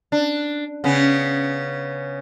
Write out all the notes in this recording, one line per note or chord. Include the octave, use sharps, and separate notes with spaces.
D4
C#3 B3 C#4